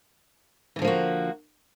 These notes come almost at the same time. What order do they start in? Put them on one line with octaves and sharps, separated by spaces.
E3 D3 F3 A#3 F#4